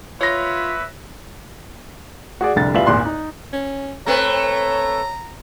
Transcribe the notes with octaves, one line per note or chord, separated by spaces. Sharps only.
F4 B4 C#5 E5 A#6
F#4 G#4 D5
F1 C2 D3 A6
E2 G3 F4 B4 E5 F#7
G#1 E2 A#2 C6 F#6
D#4
C#4
A3 C4 B4 C#5 A#5